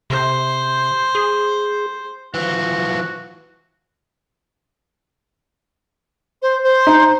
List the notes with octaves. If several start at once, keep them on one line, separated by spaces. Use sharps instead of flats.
C3 C5
G#4
E3 F3 F#4
C5
C5
D#4